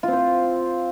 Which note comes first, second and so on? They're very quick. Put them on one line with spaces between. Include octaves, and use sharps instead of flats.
F4 C4 C5